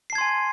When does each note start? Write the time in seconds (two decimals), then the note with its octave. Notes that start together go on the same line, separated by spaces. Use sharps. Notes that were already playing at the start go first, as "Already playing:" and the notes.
0.10 C7
0.13 A5
0.15 G#6
0.18 C6
0.21 G#5